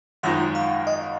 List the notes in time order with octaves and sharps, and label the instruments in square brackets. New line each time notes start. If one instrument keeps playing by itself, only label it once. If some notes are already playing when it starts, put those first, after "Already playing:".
[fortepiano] G#1 F#2 F3 G#3 D#4 [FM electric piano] F#5
[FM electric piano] F5
D#5